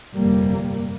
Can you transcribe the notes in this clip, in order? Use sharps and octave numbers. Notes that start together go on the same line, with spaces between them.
G1 F2 C3 G3 A#3